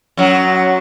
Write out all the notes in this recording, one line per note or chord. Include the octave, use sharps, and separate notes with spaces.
F#2 F#3